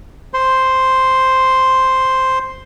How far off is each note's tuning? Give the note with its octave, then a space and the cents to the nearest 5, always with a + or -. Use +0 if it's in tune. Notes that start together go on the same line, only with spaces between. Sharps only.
C5 +0 C6 +0